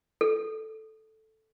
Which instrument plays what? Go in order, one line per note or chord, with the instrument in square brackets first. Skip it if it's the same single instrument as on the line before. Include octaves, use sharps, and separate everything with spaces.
[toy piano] A4